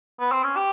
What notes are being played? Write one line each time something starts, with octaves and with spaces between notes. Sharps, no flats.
B3
C4
C#4
G4